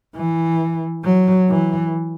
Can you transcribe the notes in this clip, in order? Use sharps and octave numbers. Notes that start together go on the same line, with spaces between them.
E3
F#3
E3